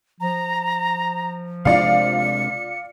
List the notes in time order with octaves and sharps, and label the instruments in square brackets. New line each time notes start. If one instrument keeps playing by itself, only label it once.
[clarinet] F3 [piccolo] A#5
[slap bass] C3 G#3 D4 [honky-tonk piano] F4 D5 F5 [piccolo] C#7